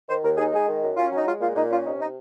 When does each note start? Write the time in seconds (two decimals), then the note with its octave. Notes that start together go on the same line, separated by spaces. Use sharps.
0.08 D#3 C5
0.23 D#2 A#4
0.37 D#4 G#4
0.52 G#3 G#4
0.67 D#3
0.82 F#2
0.97 C#4 F4
1.12 F#3 D#4
1.26 G#3 F4
1.40 A#2 F4
1.56 A#2 D#4
1.70 C#4 F4
1.85 C3 D#4
2.00 D#4